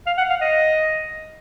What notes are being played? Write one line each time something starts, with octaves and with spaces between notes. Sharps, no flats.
F5
F#5
F5
D#5